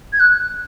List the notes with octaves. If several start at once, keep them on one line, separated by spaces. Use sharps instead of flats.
G#6
F#6